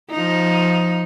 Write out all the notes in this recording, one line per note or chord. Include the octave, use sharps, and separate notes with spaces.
F3 D#4